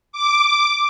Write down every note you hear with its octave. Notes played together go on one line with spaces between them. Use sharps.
D6